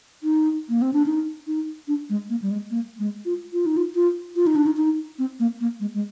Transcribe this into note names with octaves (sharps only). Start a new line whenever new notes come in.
D#4
A#3
C4
D4
D#4
D#4
D4
G#3
A#3
G3
G#3
A#3
G#3
F4
F4
D#4
F4
F4
F4
D#4
D4
D#4
D#4
C4
A#3
A#3
G#3
G#3